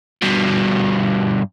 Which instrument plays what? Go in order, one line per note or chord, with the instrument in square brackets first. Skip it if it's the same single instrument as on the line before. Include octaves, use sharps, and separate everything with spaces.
[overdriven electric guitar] G2 B2